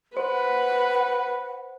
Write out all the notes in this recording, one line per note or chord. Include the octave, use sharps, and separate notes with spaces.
B4 C5 F#5